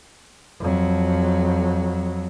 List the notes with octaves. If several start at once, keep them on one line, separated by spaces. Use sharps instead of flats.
F2 F#3